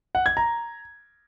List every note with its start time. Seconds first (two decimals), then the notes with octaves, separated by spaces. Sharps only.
0.15 F#5
0.26 G#6
0.37 A#5